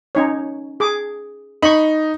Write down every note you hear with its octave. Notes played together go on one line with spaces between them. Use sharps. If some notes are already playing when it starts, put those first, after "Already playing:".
C#4 D#4 C#5
G#4 D6
D#4 B5 C#6